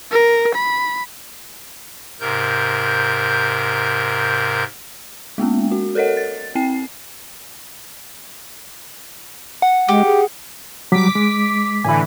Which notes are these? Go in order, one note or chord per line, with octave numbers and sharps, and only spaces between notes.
A#4
B5
G#2 C3 A#4 G6
G#3 A#3 B3 C#4
F#4
A4 A#4 C#5 D#5 F#5
A6
C4 G5 C7
F#5
G#3 G4
G#4
F#3 G3 D6 B6
G#3
A2 D3 E3 G#5 B5